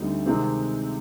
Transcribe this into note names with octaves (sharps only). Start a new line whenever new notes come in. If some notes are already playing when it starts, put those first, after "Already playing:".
Already playing: D2 D3 G3 C4 D#4
C3 D#3 G#3 C4 D#4